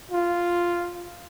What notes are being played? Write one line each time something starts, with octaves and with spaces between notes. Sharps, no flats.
F4